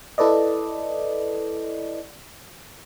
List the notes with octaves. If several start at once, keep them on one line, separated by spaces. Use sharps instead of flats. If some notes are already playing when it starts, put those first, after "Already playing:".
E4 A4 B4 D5 D#5